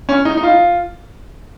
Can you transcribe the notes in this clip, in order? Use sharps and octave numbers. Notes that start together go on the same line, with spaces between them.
C#4
D#4
D#4
F4